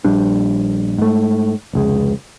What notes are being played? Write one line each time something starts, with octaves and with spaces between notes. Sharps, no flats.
A#1 G3 D4
G#2 A3
F1 C#2 G#3